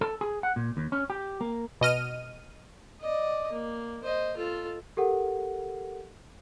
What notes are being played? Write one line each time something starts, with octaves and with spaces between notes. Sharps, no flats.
A4
G#4
F#5
A#2
D#2
C#4
G4
A#3
B2 D#5 F6 D#7
D5 D#5
A#3
C5 D#5
F4 A4
G4 A4 A#4 F#5